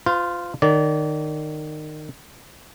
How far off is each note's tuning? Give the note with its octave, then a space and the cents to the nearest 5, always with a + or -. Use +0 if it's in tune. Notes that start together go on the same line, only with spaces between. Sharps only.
F4 +0 C5 -45
D#3 -25 D5 -30